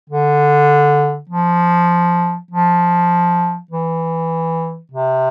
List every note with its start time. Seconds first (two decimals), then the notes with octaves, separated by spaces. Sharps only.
0.10 D3
1.30 F3
2.51 F3
3.71 E3
4.92 C3